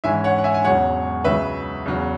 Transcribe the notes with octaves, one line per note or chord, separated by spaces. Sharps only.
G#2 E3 C#4 E4 E5 G#5
C#5 F#5
F#5
E5 G#5
G#5
E1 E2 C#3 F#3 C#5 F#5
C#2 C#3 F#3 B4 E5
E2 C#3 F#3